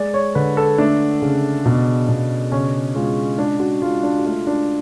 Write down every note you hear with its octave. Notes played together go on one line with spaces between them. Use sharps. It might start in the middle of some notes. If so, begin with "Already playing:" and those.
Already playing: G#3 D5
C#5
D3 B4
A4
A3 D4
C#3
B2
B2
C#3 C#4
G#3 F4
G#3 D4
F#4
G#3 F4
D4
F#4
A3 F4
D4